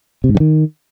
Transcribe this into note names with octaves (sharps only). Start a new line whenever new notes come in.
C3
G#2
G2
D#3